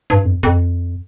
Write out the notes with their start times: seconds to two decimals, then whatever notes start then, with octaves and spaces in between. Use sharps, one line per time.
0.10 G2
0.25 F2
0.43 F2